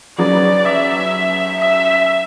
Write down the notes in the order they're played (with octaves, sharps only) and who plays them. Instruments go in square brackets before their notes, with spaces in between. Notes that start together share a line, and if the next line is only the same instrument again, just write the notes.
[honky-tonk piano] F#3 C#4 G#4 B4 [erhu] D5
[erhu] E5
E5